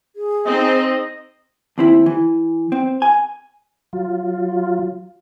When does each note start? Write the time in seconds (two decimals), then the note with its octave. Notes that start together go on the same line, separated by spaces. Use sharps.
0.16 G#4
0.46 C4 D#4 D#5
1.78 D#2 C4 E4
2.06 E3
2.72 C4
3.02 G#5
3.93 F#3 F4